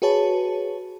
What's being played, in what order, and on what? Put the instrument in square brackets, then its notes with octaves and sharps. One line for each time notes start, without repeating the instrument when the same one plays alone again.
[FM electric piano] F#4 G#4 B4 C#5 A5